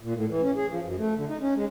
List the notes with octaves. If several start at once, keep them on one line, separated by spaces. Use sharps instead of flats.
A#2
A2
E3
C#4
G#4
F3
F#2
A3
D3
D#4
C#4
G#3